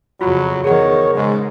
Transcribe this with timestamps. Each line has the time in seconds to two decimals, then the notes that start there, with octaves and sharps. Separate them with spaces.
0.21 F2 C#3 F#3 F4 F#4 B5
0.64 E2 D#3 G#4 A#4 C#5 F#5
1.14 G#2 C#3 G#3